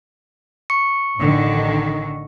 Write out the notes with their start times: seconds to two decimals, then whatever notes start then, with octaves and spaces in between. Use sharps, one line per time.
0.70 C#6 C#7
1.19 A1 D3 D#3